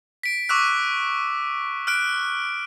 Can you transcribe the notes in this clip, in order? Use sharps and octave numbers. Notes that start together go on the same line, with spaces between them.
B6 D7
C#6 D6 E6 F#6 B6
F6 F#6 D7